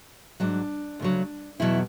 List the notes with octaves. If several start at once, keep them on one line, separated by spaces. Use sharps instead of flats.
G#2 F#3 D4
D2 C#3 F#3
E2 B2 F#3 E4